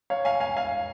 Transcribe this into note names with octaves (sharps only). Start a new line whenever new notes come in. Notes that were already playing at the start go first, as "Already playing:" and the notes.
C#5 F5
F5 G#5
F5 G#5
F5 G#5